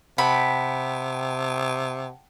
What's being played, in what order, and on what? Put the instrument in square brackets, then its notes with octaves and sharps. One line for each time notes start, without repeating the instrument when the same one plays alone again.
[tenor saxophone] C3 [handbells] F#5 G5 A5 [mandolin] B5